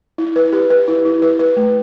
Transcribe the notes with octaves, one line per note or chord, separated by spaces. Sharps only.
E4
B4
G4
B4
E4
E4
B4
B4
A3